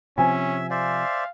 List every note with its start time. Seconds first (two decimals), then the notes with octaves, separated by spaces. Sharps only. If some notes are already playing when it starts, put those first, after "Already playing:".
0.18 C3 F3 C4 C#4 E5 G#5
0.71 C5 D5 E5 F5